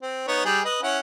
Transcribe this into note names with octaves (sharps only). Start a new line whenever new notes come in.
C4
B3 D#4 C#5
G3 G#4
B4 D#5
C#4 E4 F#5